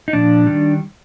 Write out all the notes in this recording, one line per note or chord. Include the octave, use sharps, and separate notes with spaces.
D#4
A#2 F3 D4
D#3 G3